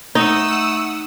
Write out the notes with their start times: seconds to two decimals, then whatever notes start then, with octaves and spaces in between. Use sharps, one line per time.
0.15 A3 D#4 F#5 D#6 E6